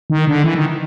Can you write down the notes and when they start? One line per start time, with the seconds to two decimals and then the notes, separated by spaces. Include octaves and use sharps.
0.10 D#3
0.27 D3
0.44 E3
0.55 D#3